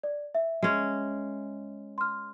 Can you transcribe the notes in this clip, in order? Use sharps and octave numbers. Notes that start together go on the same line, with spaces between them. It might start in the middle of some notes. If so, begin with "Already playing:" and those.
D5
E5
G#3 C#4
C6 F6